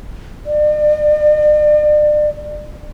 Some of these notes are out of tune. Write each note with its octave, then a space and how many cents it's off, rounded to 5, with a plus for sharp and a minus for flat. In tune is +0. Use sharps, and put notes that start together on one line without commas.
D5 +40